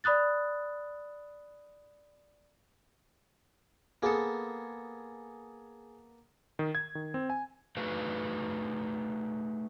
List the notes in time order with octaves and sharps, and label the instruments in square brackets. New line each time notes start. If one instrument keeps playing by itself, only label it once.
[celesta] D5 B5 D#6 F#6 A6
[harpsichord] A#3 B3 A4 [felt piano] G#4
[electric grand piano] D#3
G#6
D#3
C4
G#5
[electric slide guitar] A3 D#4 F#4 G#4 B4 F5